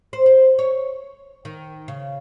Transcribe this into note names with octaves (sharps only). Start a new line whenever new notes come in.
C5
C5
C#5
D#3
C#3